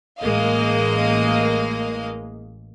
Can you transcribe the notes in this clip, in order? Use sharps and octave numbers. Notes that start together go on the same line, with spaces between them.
A1 G#3 A#3 D#5 F5